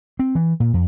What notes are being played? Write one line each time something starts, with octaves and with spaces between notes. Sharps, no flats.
C4
E3
A#2
F2